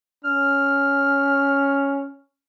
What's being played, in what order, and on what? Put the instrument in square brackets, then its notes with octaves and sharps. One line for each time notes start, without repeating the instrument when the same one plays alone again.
[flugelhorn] C#4 [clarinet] F6